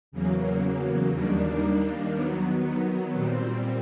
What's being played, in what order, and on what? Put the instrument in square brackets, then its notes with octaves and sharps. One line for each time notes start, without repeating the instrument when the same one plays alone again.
[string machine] E2 C#3 F#3 A#3
D#2 D#3 G3 A#3 D4
D#3 F#3 B3
A#2 G3 C4